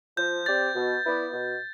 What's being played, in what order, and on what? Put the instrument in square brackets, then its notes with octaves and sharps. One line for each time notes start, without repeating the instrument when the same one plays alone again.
[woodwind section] F3 [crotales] G6
[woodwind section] C4 G4 D5 [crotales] A6
[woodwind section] B2
B3 E4 B4 D5
B2